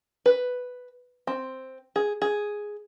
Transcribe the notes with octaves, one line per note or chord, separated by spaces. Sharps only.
B4
C4
G#4
G#4